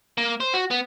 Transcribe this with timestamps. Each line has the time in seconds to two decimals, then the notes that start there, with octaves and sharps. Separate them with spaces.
0.18 A#3
0.40 C5
0.54 F#4
0.70 B3